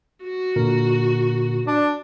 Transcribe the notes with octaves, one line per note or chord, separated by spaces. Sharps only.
F#4
A#2 D3 A#4
D4 D5